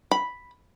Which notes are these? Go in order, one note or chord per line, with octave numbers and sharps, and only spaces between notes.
B5